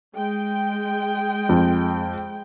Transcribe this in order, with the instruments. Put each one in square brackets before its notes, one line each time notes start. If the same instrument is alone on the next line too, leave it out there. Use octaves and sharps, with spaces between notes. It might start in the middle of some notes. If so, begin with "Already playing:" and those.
[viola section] G#3 G5
[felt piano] F2